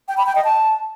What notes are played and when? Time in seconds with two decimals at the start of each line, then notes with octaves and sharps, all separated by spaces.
0.08 G5
0.17 B5
0.26 G5
0.35 D#5
0.44 A5